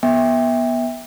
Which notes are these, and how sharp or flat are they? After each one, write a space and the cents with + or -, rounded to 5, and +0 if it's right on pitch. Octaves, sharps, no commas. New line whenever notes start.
B3 -20 E5 -15 G5 +30